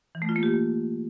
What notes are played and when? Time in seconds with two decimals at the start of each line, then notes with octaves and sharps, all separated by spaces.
0.15 E3
0.22 A3
0.29 F4
0.36 A#3
0.43 G4